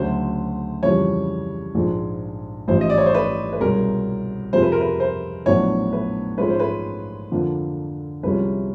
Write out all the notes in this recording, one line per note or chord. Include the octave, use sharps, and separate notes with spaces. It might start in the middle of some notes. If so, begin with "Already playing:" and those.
Already playing: D2 C#3 F#3 C5
F2 C#3 E3 G3 C#5
A#1 G#2 F3 G#3
A1 G#2 F3 C5
D#5
D5
C#5
C5
B4
B4
C2 B2 G#3 C#4 A#4
F2 C3 F3 G#3 C5
B4
A#4
B4
C5
A#1 A2 F#3 B3 D4 C#5
B4
G#2 F3 G#3 C#4 B4
C5
B4
F2 D3 F3 A#3
C2 C3 F3 G#3 C#4 B4